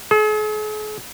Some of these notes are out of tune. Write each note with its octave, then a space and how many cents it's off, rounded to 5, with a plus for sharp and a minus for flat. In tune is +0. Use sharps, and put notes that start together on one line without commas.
G#4 +45